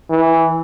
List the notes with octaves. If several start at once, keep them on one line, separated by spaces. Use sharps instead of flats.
E3